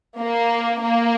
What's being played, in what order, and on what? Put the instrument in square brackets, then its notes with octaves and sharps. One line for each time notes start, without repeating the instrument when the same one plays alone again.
[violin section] A#3
A#3